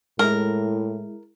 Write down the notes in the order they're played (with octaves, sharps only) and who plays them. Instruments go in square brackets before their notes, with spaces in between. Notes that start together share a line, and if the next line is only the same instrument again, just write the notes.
[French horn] A2 [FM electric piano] G#3 E4 [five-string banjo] A#4